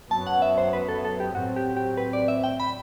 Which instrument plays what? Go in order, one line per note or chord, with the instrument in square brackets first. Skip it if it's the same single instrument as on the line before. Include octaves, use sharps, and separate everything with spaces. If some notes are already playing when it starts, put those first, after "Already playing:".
[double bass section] F#2 F#3 B3 [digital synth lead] A5
[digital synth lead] F#5
E5
C5
B4
A4
A4
G4
[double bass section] A2 F#3 C4 [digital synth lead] F#4
[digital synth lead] G4
G4
B4
D5
E5
G5
B5